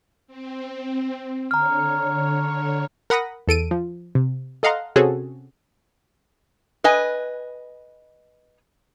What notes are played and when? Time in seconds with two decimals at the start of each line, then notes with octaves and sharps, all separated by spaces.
0.27 C4
1.51 D3 C#5 A#5 F6
3.10 A#4 F#5 B5 D#6 A#6
3.47 E2 A4 D7 D#7
3.71 F3
4.15 C3
4.63 A4 D#5 F5 F#5 A#5 C6
4.96 C3 C4 C#4 F#4 G#4 A4
6.84 B4 D#5 G#5